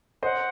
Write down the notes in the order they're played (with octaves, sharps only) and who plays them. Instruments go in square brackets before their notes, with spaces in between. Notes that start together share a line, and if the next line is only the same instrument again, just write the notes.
[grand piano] C5 D#5 [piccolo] F#5